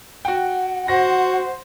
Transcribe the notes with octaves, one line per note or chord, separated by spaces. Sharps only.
F#4 F#5 G5
F#4 C5 A#6